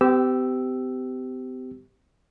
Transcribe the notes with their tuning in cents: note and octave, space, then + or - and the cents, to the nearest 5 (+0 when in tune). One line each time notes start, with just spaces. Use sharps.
C4 -45 G4 -15 E6 +0